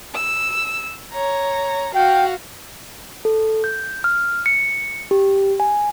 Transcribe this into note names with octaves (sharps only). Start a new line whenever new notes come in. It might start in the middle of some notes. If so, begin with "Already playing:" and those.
E6
C#5 A#5
F#4 F5 G5
A4
G6
F6
C#7
G4
G#5